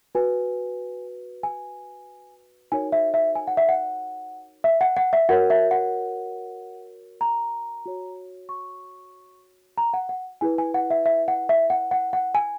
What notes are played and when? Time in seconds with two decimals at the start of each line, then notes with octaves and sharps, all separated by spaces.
0.15 F#4 B4 G#5
1.43 G#5
2.72 D#4 F#4 A#4 C#5 G#5
2.92 E5
3.14 E5
3.35 G#5
3.47 F#5
3.57 E5
3.69 F#5
4.64 E5
4.81 F#5
4.97 F#5
5.13 E5
5.29 F#4 A#4 C#5 F#5
5.50 E5
5.71 F#5
7.21 A#5
7.86 F#4 C#5
8.49 C#6
9.78 A#5
9.94 F#5
10.09 F#5
10.41 E4 G#4 B4 G#5
10.58 G#5
10.74 F#5
10.90 E5
11.06 E5
11.28 F#5
11.49 E5
11.70 F#5
11.91 F#5
12.13 F#5
12.35 G#5